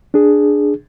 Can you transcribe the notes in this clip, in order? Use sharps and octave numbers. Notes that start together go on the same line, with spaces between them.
D4 G#4